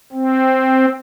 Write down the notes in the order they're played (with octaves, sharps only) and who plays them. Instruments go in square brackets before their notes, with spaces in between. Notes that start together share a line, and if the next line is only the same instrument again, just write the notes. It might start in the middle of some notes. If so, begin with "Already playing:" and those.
[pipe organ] C4